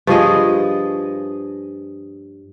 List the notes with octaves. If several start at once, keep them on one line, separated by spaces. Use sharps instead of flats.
G2 F3 G#4 D#5